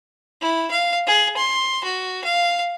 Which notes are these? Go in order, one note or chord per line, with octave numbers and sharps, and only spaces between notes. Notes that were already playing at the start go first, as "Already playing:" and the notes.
E4
F5
G#4
C6
F#4
F5